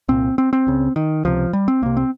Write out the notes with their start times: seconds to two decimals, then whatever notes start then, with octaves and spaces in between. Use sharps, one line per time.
0.08 C2 A#2 C4
0.38 C4
0.53 C4
0.67 C#2 C#3
0.96 D#3
1.25 C#2 C3 F3
1.53 G3
1.68 C4
1.82 C2 C3 A#3
1.97 C4